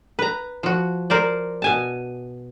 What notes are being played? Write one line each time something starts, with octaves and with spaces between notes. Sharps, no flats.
B4 A#5
F3 F#4
A#4 C5 D5
B2 G#5 A5